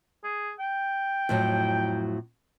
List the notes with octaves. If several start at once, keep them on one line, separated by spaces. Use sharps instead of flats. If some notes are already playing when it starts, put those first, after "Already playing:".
G#4
G5
F2 A2 F#3